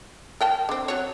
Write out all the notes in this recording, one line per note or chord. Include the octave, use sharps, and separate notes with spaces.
A#4 G5 A5
D3 C4
F#3 C#5